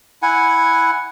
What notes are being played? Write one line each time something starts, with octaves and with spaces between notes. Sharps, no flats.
E4 F#5 G#5